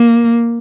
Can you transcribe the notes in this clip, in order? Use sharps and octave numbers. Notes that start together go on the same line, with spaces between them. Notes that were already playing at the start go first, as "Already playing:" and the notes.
Already playing: A#3